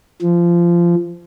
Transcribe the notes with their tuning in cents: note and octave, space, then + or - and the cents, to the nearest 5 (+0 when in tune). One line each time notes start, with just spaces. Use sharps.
F3 -20